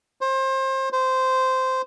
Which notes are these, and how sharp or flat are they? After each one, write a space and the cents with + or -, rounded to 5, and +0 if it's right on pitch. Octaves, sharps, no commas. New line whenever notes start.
C5 +30
C5 -10